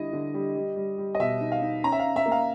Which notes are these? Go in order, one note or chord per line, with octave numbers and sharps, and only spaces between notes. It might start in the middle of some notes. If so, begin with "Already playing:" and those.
Already playing: D3 G3 E4 D#5
D3
G3
G3
G3
G3
D#5
B2 E5
D#4
F5
D#4
C#4 A#5
E5
C#4 F5
E5
A#3
F5